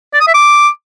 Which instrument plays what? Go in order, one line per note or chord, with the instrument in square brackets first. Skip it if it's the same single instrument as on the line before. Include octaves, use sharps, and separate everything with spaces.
[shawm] D5
D#6
E5
D6